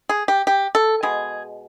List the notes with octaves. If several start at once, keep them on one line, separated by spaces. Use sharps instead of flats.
G#4
G4
G4
A4
B2 G#3 B3 G#4